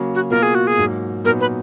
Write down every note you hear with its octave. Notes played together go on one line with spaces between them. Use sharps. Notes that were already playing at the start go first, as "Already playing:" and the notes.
Already playing: C#3 F#3 A#3
F#4
B2 A#3 F4 A#4
G#4
F#4
G#4
G#2 F#3 A#3
A#2 F#3 B3 D#4 A#4
B4